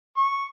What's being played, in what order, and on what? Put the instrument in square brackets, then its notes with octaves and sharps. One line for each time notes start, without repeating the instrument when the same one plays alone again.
[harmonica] C#6